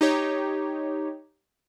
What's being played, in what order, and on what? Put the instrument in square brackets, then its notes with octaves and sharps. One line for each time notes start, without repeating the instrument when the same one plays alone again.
[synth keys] D#4 G4 C#5